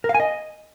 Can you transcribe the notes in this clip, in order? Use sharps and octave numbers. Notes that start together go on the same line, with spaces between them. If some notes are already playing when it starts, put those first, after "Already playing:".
A#4
F5
G#5
D#5